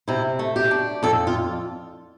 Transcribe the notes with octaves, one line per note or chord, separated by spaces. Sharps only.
C3 E4
A3
G4
D4
F2 A4
F4